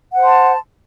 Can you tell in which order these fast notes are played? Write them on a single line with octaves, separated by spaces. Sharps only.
F#5 C5 C6 A5